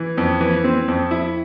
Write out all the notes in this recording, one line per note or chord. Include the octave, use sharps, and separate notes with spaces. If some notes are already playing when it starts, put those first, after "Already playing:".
Already playing: E3
F2
E3
C4
F2
E4